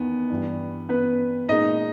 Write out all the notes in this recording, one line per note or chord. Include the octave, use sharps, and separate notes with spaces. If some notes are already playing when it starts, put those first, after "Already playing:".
Already playing: E2 D#3 B3
G2 E3 G3
B3 B4
A#2 G#3 D#4 D#5